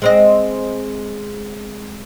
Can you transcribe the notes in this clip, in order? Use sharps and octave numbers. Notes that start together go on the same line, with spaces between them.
G#3 C4 D#5